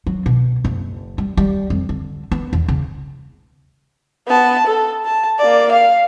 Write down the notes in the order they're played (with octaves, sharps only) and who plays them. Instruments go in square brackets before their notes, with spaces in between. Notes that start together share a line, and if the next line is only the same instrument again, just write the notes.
[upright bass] F#3
B2
F#1
G3
G3
F2
D3
B3
E2
C#3
[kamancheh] B3 A5
A4
A5
A#3 D5
F5